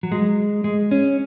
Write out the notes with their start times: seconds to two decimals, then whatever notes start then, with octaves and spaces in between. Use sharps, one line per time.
0.03 F#3
0.12 G#3
0.64 G#3
0.91 C#4